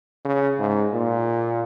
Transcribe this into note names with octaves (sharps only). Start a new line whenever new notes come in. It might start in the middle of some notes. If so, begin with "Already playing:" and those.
C#3
G#2
A#2